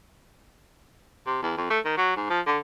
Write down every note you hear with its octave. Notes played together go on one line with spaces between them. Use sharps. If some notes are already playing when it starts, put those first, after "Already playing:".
C3
E2
F2
A3
D#3
F#3
G#2
F3
D3